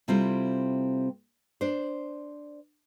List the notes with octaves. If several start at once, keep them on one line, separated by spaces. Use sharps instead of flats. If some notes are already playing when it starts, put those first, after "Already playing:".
C3 G3 C4 E4 F4 A4
D4 C5